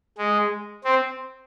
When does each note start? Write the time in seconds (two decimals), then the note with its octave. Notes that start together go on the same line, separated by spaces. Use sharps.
0.18 G#3
0.84 C4